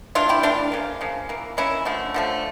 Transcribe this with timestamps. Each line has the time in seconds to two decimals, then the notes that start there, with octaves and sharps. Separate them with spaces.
0.15 E3 A3 D4 F4
0.29 E4 G4
0.43 E3 A3 D4 F4
0.72 C#3 F3 A#3
1.01 C#3 F3 A#3
1.29 E3 A#3
1.57 E3 A#3 C#4 E4
1.85 D3 F3 A3
2.14 D3 F3 A3